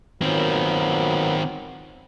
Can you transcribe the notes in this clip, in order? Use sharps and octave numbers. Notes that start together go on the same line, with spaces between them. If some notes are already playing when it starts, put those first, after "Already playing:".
A#2 D#3 F#3 B3 C4